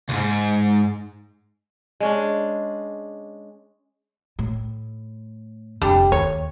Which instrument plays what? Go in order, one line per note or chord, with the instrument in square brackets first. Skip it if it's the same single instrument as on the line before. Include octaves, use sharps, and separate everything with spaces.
[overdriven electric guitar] C#2 G#2
[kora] G#3 C#4 D4
[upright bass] A2
[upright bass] F1 D3 [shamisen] G3 D4 G4
[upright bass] D#2 [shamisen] C#5